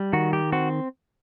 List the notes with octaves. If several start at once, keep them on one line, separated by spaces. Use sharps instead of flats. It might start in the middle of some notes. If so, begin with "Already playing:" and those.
Already playing: G3
D#3 F#4
G4
C4 F#4